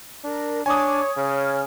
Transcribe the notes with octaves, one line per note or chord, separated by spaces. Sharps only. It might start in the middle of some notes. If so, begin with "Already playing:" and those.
D4 A#4
D4 C#5 G#5 D6 D#6
C#3 C#5 F6